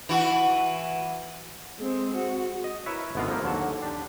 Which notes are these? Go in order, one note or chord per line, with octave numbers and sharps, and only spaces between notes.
E3 F#4
G#3 C4
F#4
D#5
E4 A#4 B4 C#5 E5
G#1 D3 B3 D5 D#5 F5
F3 A#3
D#2 D3 F#3 F#4 A5
D4 G4